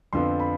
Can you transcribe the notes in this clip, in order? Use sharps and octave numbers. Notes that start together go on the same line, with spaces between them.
F2 D3 F3 B3 C6
B5